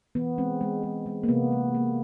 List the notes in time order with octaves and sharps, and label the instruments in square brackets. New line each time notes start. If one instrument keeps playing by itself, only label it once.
[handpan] E3 B3
G#3 C4
G#3
G#3
G#3
A#3
C3 B3
G#3
A#3